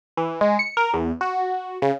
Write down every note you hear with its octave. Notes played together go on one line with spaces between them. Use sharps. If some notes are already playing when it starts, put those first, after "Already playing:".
E3
G#3
C#7
A#4
E2
F#4
C#3